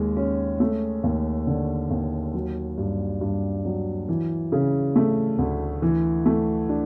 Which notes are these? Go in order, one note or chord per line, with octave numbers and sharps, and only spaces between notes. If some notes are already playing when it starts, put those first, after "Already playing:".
Already playing: D#2 G#3
C#4
A3
D#2
D3
D#2
F#3
G2
G2
F#3
E3
C#3
A3
D2
E3
A3
D4